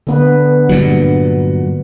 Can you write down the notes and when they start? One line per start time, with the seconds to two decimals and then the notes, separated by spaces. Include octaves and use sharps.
0.07 D3 B3 B4
0.69 G2 A#2 F#3